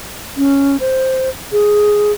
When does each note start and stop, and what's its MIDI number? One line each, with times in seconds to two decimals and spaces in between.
0.37 0.76 61
0.80 1.29 72
1.52 2.12 68